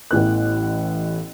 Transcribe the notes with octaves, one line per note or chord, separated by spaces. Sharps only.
A1 A2 E3 B3 F#6